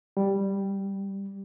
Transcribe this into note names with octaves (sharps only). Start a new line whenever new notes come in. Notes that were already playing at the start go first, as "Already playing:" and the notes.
G3